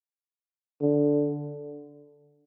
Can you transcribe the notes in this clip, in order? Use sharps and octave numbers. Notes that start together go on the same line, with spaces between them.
D3